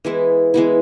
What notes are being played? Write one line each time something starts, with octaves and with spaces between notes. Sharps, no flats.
E3 G#3 B3 E4
E3 G#3 B3 E4